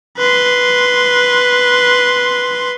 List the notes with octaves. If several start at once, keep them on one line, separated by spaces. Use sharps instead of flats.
B4 C6